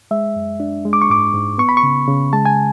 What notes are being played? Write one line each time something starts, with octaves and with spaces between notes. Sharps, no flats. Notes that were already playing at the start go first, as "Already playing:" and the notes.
G#3 E5
F#2
D4
G#3
D6
C#6
G#2 D6
G#2
B3 C#6
B5
C#6
C#3
C#3
G#3 A5
G#5